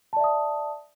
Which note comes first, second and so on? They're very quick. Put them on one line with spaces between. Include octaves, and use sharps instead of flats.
A5 D5 E5 D#6